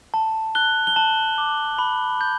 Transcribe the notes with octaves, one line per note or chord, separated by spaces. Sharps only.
A5
F#6 G7
G7
A5 F#7
D6
B5
G6